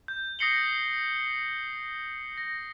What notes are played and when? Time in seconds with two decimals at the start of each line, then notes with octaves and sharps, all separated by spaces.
0.08 G6
0.39 D#6 A#6 C7 C#7 F#7 G7
2.37 A#6